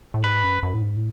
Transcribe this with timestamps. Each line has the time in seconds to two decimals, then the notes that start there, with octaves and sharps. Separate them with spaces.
0.14 A2
0.23 G#2 B4
0.43 F#2
0.63 F#2
0.74 A2
0.82 G#2
0.97 A2